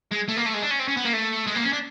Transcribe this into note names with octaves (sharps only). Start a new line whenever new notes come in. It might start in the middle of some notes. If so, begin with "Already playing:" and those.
G#3
A3
A#3
A3
G#3
D4
C#4
C4
C#4
B3
A#3
A3
G#3
A#3
C#4
D4